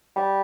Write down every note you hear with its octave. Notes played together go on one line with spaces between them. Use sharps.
G3